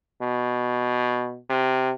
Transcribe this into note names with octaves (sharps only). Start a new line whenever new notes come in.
B2
C3